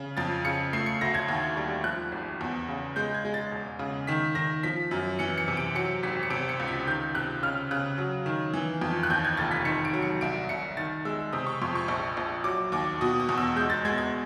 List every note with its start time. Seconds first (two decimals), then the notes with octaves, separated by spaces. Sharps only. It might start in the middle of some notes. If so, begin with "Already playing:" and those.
Already playing: C#3
0.17 F2 A6
0.45 C#3 C#7
0.73 A3 C7
0.86 C#7
1.01 D2 A#6
1.15 G#6
1.28 D#2
1.57 G3
1.84 F3 F#6
2.12 G#1
2.41 E2
2.69 C#3
2.96 G#3 G6
3.14 G#6
3.25 G#3
3.34 A6
3.52 E1
3.79 C#3
4.07 D#3 B6
4.35 D#3 A#6
4.63 F3 B6
4.91 F#2
5.19 E3 C#7
5.38 C#7
5.48 C3
5.57 D7
5.75 F#3 C#7
6.03 G#1 B6
6.23 C#7
6.30 C3 D7
6.49 C#7
6.59 C#2
6.68 B6
6.87 D#3 G6
7.14 C3 F#6
7.43 C#3 F6
7.71 C#3 F#6
7.98 F#3
8.26 D#3
8.54 E3
8.81 F2
9.03 F#6
9.10 D#2 G6
9.25 G#6
9.37 F1 A6
9.51 B6
9.65 D#3 C#7
9.85 D7
9.94 F#3
10.02 C#7
10.21 C2 D7
10.49 C2 C#7
10.77 D#3 A6
11.05 G#3 E6
11.33 C3 D#6
11.47 C#6
11.62 F2 C6
11.75 C#6
11.88 A#1
12.17 A#1
12.44 F#3 D6
12.72 D#2 D6
13.01 B2 D#6
13.20 D#6
13.29 E2
13.38 E6
13.56 G#3 G6
13.70 A6
13.85 G#3 G#6
13.98 G#6